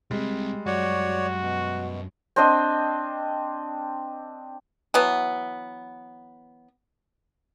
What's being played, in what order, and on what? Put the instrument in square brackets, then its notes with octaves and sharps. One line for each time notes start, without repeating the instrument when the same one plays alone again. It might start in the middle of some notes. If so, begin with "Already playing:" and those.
[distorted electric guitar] C2 C3 [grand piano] G3 G#3
[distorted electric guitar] F#2 [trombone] F#4 [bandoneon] C#5 D5
[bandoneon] B2
[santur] C4 D4 D#5
[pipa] E3 F#3 B3